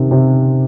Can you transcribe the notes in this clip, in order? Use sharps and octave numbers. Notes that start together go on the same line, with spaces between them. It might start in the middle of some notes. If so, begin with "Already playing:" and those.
Already playing: C3 D#3
C3